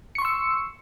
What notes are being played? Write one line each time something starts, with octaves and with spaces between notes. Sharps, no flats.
C6 C#6 E6 C#7